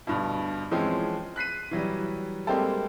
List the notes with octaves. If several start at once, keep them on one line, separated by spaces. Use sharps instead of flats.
D2 G2 B2
E3 F3 G#3 C4 C#4
F#6 B6 C7 D#7
E3 F#3 G3
G3 G#3 A#3 C4 G4 A4